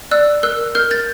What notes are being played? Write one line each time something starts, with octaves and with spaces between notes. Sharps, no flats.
D5 E6 F#6
A#4 E6 F#6
A#4 F6 G6
G6 A6